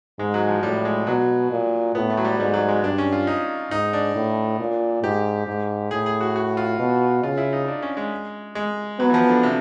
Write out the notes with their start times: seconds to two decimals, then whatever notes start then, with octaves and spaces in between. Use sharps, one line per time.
0.19 G#2 G#3
0.34 F#3
0.48 F3
0.63 A2 G3
0.85 G#3
1.07 B2 F#3
1.51 A#2
1.95 A2 B3
2.10 A3
2.17 F#3
2.24 G3
2.39 G#2 G3
2.54 F#3
2.68 G#3
2.83 G2 D4
2.98 C#4
3.13 F4
3.27 D#4
3.71 G#2 D#4
3.93 D4
4.15 A2
4.60 A#2
5.03 G#2 G4
5.47 G#2
5.91 A2 G#4
6.06 G#4
6.21 F#4
6.36 F#4
6.57 F4
6.79 B2
7.23 C#3 F4
7.38 E4
7.53 D#4
7.68 D4
7.82 C#4
7.97 G#3
8.55 G#3
9.00 F#3 B3
9.09 E3
9.14 F3
9.29 D3
9.43 C3